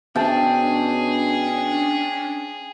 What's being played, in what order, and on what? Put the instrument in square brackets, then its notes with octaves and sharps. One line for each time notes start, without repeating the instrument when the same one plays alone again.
[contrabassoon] B2 [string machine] C#4 D4 [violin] G#4 [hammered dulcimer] G5 A5